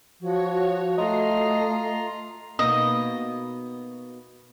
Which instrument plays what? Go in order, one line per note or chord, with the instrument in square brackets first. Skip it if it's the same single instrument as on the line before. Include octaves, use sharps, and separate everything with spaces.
[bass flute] F3 [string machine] F#4 C#5
[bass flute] A3 [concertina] F4 A#5 [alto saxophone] D#5 [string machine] C7
[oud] B2 A#3 D#4 [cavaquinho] D#5